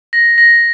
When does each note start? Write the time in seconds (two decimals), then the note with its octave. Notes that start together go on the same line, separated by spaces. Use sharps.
0.13 A#6
0.38 A#6